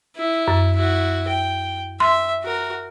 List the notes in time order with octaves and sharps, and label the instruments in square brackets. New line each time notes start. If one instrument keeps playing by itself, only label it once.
[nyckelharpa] E4
[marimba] F#2
[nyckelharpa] E4 F#4
G5
[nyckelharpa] E5 [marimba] C6
[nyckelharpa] F#4 A#4